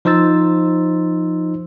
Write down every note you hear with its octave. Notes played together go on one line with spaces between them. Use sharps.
F3 D#4 C5 E6 A6